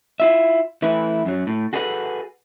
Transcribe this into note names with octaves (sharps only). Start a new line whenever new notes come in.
E4 F4 E5
E3 A3 E4 B4
F#2 F#3
A2
F#4 G#4 A4 B4 D5 F#5